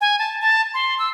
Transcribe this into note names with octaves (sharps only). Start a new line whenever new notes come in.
G#5
A5
A5
C6
E6